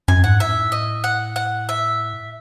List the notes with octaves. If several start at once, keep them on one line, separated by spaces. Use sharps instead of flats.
F#2 G#5
G#2 F#5
A2 E5
D#5
F#5
F#5
E5